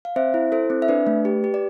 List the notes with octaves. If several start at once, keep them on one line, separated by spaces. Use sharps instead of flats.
F5
C4 C5 E5
E4
E4 A4 C5
C4
E5
D4 B4 D5
A3
G4
G4
D5